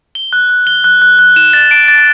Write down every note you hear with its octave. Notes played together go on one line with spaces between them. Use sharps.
G7
F#6
F#6
G7
F#6
F#6
F#6
E7
A6
D7
A6